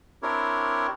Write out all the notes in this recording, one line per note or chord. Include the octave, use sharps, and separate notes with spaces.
C4 D4 E4 G4 A#4 C#5